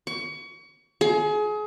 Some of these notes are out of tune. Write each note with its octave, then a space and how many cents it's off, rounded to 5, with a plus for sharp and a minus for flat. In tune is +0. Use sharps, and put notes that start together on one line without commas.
C#6 +30
G#4 +30